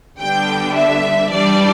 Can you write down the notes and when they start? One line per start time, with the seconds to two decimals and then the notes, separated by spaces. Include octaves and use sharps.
0.20 D3 G3 B3 D4 G5
0.75 E5
1.31 E3 G3 D4 D5